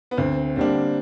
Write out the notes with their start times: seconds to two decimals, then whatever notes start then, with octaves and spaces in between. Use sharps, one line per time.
0.11 B3
0.17 D2 C4
0.56 D3 G3 A#3 C4 D4